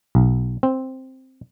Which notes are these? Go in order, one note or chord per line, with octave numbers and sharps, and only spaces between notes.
B1
C4